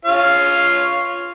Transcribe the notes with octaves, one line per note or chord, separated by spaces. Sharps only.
F4 C#5 F5